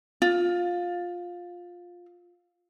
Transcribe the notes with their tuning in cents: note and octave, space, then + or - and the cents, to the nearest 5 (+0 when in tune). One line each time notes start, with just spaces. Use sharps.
F4 +10